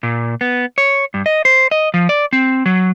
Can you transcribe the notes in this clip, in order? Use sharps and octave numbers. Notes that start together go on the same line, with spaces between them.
A#2
B3
C#5
G2
D#5
C5
D#5
F3
D5
C4
F#3